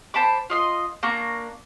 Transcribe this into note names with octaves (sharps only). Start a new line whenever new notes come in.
C5 A5 B5 D6
F4 D#5 C6
A#3 D4 A#5 C#6